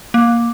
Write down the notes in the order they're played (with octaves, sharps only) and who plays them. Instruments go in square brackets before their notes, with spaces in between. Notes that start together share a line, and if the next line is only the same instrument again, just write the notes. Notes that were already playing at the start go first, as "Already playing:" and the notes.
[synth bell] A#3